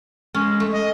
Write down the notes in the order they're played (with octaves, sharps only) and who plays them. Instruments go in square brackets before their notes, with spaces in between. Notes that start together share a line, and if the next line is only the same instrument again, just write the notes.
[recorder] G#3 [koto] C#4
[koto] A3
[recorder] D#5